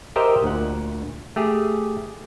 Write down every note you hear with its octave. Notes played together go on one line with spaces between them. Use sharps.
G4 A#4 C5 D#5 E5 G5
D2 A#2 F#5
A3 G4 G#4